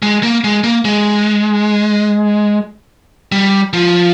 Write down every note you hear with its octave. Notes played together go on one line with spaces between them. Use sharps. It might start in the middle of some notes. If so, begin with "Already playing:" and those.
G#3
A#3
G#3
A#3
G#3
G3
F3